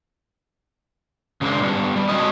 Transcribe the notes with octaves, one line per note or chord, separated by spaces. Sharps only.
C#3 F#3 G#3 D4 A#4 C5
G3 B3
G3
G#3 A3 C4 C#4 F#4 D#5